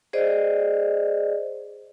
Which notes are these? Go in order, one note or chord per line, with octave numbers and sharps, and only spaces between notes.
G#4 C5 D5 D#5